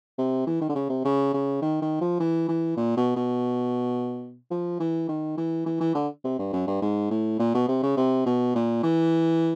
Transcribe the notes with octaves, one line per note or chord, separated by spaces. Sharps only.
C3
E3
D#3
D3
C#3
C3
C#3
C#3
D#3
D#3
F3
E3
E3
A#2
B2
B2
F3
E3
D#3
E3
E3
E3
D3
C3
G2
F#2
G2
G#2
A2
A#2
B2
C3
C#3
C3
B2
A#2
E3